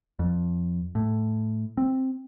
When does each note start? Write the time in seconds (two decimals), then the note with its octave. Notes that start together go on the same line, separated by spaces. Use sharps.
0.19 F2
0.95 A2
1.77 C4